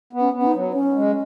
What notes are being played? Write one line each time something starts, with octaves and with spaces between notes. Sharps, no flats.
B3
C#4
B3
C#4
D#4
F#3
C#4
G#3